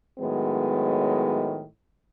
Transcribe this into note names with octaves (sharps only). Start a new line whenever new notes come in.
A2 D#3 F#3 G#3 B3